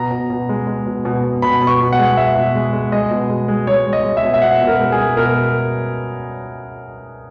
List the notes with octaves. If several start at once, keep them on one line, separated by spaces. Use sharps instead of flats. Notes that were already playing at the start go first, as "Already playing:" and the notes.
Already playing: B2 A#5
B2
B2
G#3
G#3
B2
B2
B2
B2 B5
B2
C#6
B2
F#5
G#3
G#3 E5
B2
G#3
G#3
G#3 D#5
B2
G#3
G#3
G#3 C#5
G#3
D#5
G#3
E5
B2
E5
B2 F#5
B2
A#4
G#3
G#4
G#3
B2 A#4